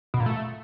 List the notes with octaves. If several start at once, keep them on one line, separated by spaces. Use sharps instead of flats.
B2
A#2
A3